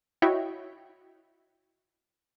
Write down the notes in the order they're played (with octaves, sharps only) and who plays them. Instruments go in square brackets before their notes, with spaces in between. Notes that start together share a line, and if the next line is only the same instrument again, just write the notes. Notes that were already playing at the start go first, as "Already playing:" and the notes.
[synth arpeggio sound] E4 F#4 C#5 D#5 E5 G5